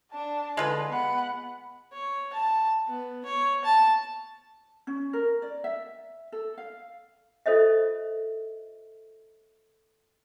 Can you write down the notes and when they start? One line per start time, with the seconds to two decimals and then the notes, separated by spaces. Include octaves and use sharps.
0.12 D4 A5
0.57 D3 G#3 F4 B4
0.92 B3 F#5 B5
1.93 C#5
2.33 A5
2.87 B3
3.25 C#5
3.65 A5
4.87 C#4
5.13 A#4
5.42 D5
5.64 E5
6.32 A4
6.58 F5
7.46 F4 A4 C5 D#5 E5